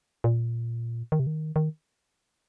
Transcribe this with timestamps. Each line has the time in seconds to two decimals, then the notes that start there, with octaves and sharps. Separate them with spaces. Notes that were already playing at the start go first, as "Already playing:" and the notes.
0.24 A#2
1.12 D#3
1.20 C3
1.27 D#3
1.56 D#3